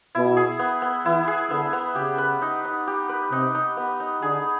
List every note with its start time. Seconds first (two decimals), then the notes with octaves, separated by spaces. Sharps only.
0.15 B2 E4
0.37 G#4
0.59 B3
0.82 B3
1.05 E3 E4
1.28 G#4
1.51 D3 B3
1.73 B3
1.95 C#3 G4
2.18 B4
2.42 D#4
2.64 D#4
2.87 G4
3.09 B4
3.32 C3 D#4
3.55 D#4
3.77 B3
4.00 D#4
4.22 D3 G#4